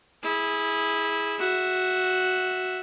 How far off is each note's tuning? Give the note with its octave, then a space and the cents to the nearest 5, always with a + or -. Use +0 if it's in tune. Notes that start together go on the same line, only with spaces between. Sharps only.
E4 -15 G#4 +0
F#4 +0 E5 +0